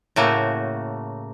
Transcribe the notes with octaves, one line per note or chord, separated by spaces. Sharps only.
A2 C#3 A3 A#3 F#4